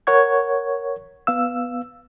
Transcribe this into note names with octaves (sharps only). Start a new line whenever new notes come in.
A#4 C#5 F#5 C#6 G#6
B3 F5 E6